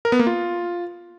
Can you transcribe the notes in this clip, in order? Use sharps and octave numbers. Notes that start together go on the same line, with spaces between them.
A#4
B3
A#3
F4